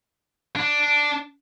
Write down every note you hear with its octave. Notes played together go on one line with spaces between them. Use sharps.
D4